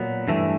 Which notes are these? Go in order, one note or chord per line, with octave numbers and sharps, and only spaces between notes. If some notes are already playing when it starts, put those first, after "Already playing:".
Already playing: A#2 F#3 B3
G2 E3 A3